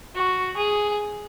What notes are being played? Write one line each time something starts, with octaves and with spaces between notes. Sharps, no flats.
F#4
G#4